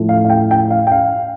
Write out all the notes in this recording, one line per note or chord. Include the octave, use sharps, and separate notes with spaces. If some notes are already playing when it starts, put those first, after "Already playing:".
Already playing: A2 F3 A3
F5
F5
G5
G5
F5
G5
F5